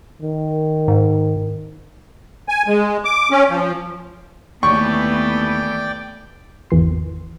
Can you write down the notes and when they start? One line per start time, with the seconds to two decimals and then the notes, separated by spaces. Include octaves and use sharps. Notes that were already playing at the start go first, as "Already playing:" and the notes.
0.22 D#3
0.88 G#2
2.49 G#5
2.68 G#3
3.05 D6
3.31 C#4
3.50 F3
4.63 D#2 E3 A3 B3 D5 G5 C#6
6.70 G#1 E2 E3 C6